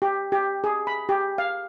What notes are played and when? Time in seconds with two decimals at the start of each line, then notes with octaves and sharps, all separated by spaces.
0.02 G4
0.32 G4
0.64 G#4
0.87 B5
1.09 G4
1.38 F5